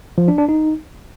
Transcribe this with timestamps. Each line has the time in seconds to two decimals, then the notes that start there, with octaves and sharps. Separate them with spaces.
0.18 F3
0.28 D4
0.38 D4
0.49 D#4